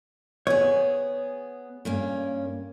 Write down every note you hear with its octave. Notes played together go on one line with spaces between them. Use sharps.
B3 G#4 C#5
G2 A#3 C#4